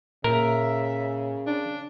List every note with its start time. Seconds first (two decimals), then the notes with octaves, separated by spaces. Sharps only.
0.24 A#2 C#3 A#4 E5
1.47 D4